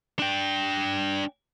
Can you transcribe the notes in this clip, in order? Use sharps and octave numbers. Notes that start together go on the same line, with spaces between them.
D4 G5